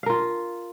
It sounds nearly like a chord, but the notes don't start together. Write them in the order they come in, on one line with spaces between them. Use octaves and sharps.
F5 A#4 F4